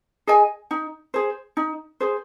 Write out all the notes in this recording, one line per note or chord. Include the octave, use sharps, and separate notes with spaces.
G#4 D#5 G#5
D#4
G#4 C5
D#4
G#4 C5